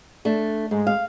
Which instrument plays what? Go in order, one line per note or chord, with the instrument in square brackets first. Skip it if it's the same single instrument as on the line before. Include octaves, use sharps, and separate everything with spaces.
[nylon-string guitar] A3 D4
[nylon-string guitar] G#2 [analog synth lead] G#3
[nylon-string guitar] F5